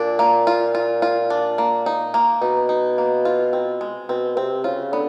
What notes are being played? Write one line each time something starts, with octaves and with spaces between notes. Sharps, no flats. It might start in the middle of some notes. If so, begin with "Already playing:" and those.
Already playing: A#2 D4
A#3
F4
F4
F4
D4
A#3
D#4
A#3
B2 D#4
D#4
A#3
F4
C4
G#3
B2 C4
C3 C4
C#3 F4
D3 B3